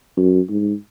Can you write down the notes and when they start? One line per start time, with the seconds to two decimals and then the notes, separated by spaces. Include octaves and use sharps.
0.17 F#2
0.49 G#2